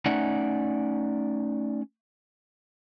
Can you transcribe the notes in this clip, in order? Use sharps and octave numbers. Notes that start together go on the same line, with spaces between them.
A3 C#4 D#4 D5 E5 F#5